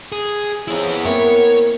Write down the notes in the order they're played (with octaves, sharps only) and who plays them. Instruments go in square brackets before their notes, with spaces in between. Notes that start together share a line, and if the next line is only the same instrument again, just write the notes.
[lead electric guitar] G#4
[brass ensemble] F2 C#3 [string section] B3 [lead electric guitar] E4 G#4
[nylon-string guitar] A#3 C4 E4 [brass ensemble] A#4 [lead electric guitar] C#5